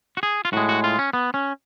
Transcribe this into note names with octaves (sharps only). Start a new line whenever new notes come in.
F#4
G#4
F4
A2 G#3 F#4
F#4
F4
C#4
B3
C#4